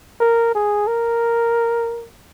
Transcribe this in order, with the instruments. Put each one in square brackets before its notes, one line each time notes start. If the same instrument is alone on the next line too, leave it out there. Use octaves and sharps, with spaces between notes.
[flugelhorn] A#4
G#4
A#4